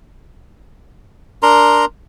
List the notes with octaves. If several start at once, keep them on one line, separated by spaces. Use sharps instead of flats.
D4 A#4 A#5 C6